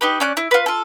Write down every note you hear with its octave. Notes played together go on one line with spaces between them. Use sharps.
D#4 G4 B4
C#4 D5 F#6
E4
F4 B4
F4 A4